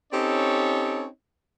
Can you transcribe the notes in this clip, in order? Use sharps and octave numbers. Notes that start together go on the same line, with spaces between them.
C4 C#4 D#4 G4 A4 C#5